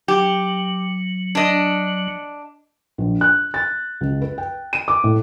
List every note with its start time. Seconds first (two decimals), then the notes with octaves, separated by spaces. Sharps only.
0.08 F#3 G4
1.35 D4 D#5
2.98 A#1
3.21 F#6
3.54 A6
4.01 C#2
4.22 B4
4.38 G5
4.73 D#7
4.88 D6
5.04 A2